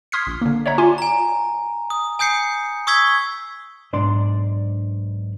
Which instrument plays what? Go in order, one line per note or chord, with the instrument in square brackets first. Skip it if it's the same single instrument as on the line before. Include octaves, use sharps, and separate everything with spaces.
[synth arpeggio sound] C6 D#6 F6 G#6 B6 C7
A#1
D3 A#3
C#5 D5 E5 F#5 A#5
F4 G#5 C6 D6
[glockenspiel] G#5 A#5
D#6
G#5 D#6 G6 C7 C#7
C#6 D#6 E6 G#6 B6 G7
[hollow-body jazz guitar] B1 G#2 D4 D5 C6